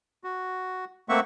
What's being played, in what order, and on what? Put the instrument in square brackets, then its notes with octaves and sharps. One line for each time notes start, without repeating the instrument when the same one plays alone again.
[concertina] F#4
A3 A#3 C4 E5 F#5 C#6